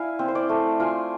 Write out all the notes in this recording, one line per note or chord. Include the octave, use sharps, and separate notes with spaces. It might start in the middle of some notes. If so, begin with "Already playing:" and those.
Already playing: E4 D5 F5 G#5
C4
C5
D5
A3
F4 G#5